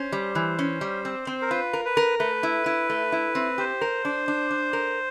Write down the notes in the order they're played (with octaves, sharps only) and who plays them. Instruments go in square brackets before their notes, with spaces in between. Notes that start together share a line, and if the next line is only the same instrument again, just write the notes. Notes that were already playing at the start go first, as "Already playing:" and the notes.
Already playing: [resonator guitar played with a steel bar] C#4 [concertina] C5
[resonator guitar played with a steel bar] G3
E3
C#4
G3
C4
C4
[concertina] A#4
[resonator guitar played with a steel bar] F4 [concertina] B4
[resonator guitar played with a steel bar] A#4
[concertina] B4
[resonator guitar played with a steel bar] A#4
[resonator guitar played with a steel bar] A3 [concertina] B4
[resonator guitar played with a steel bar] E4
E4
A3
E4
C4
[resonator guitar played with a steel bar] G4 [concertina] C5
[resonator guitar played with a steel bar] A#4
D4
D4
D4
A#4